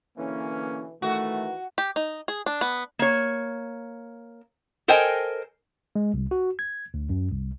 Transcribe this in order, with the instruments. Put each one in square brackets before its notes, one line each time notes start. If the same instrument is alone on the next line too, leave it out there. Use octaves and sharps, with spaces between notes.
[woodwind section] B2 D3 E3 [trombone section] A#3 C#4
[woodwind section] D#3 E3 [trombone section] A3 [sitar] F#4
[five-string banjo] G4
D#4
G#4
D4
B3
[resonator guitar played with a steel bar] A#3 C#5
A4 A#4 C5 D#5 G5 G#5
[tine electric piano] G#3
C2
F#4
G#6
D2
F#2
C2